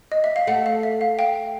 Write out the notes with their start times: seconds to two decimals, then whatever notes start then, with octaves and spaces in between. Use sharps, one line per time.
0.12 D#5
0.24 E5
0.36 F5
0.47 A3 F#5
0.66 F5
0.83 E5
1.01 F5
1.19 F5 G5